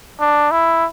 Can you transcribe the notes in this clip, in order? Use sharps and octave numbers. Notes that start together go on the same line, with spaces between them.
D4
E4